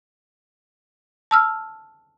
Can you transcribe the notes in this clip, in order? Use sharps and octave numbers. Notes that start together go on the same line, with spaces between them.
A5 E6 F6